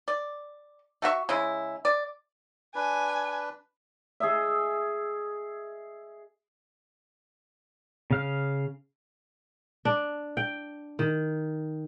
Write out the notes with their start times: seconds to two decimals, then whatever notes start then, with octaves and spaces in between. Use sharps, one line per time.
0.08 D5
1.02 A3 F#4 E5 C#6
1.29 C#3 G#3 E4
1.85 D5
2.75 D4 B4 G#5
4.20 G#4 D#5 E5
8.11 C#3 F5 F6
9.85 D4
10.37 G5
10.99 D#3